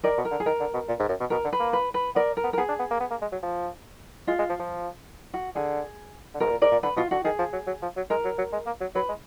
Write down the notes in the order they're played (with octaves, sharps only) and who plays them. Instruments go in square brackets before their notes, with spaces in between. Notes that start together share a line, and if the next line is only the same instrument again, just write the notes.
[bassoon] D#3 [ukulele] A#4 D5
[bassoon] B2
[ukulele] A#4
[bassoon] D3
[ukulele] G#4
[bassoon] D#3 [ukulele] A#4
[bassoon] D3
B2
A#2
G#2
F#2
B2
[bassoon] B2 [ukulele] A#4
[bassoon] D3
[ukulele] B4
[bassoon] A#3
[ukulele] B4
B4
[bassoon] B3 [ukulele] A#4 D5
[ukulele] A#4
[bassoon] B3
[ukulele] A#4
[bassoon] B3 [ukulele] G#4
[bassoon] D4
B3
A#3
B3
A#3
G#3
F#3
F3
[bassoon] G#3 [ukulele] F4
[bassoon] G#3
F3
F3
[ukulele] F#4
[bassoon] D3 [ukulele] G#4
[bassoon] D3
[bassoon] B2 [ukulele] A#4
[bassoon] G#2
A#2
[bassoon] G#2 [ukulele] A#4 D5
[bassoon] A#2
[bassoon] D3 [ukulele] B4
[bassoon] B2 [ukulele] F4
[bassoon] D3 [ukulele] F#4
[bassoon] D#3 [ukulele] G#4
[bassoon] F3
F#3
F#3
F3
F#3
[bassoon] G#3 [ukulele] A#4
[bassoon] F#3
F#3
G#3
A#3
F#3
[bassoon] F#3 [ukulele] B4
[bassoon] G#3